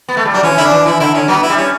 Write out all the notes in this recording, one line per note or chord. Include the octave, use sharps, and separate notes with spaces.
B3
A3
G3
F#3 D4
E3 C#4
D3 E4
D4
E3
E3 E4
D3 E4
D3 C#4
F#3 B3
E4
G3
C#4